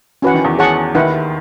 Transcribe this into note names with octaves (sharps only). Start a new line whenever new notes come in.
E3 C#4 F#4 B4 F#5
D#3
E2 E3
G#4 C#5 F#5 A5 C#6
D#2 D#3 E4 B4 F#5